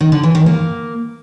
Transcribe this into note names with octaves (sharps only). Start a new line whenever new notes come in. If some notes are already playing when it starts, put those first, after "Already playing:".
D#3
D3
E3
D#3
A#3